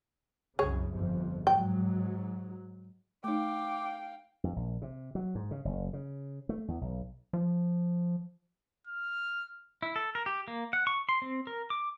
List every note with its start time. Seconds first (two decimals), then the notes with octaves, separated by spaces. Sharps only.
0.59 C2 F#2 C#3 G#4 C#5
0.93 G1 F2 F3
1.47 G#2 F#3 G5
3.24 A3 D#4 F5 G5 D6
4.44 F2
4.56 A#1
4.82 C3
5.15 F#3
5.35 G#2
5.51 C#3
5.65 F#1
5.93 C#3
6.49 A3
6.68 E2
6.81 B1
7.33 F3
8.87 F6
9.82 E4
9.96 A4
10.15 A#4
10.26 G4
10.48 A#3
10.73 F#5
10.87 C#6
11.09 C6
11.22 C4
11.47 A#4
11.70 D6